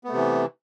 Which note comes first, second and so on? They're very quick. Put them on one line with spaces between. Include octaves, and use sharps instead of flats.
B3 A3 C3 E3